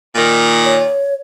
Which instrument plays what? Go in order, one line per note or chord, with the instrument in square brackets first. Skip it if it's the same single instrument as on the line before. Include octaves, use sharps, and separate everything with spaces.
[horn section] A#2 D#3
[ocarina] C#5